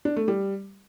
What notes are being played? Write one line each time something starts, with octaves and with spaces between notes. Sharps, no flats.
D4
A3
G3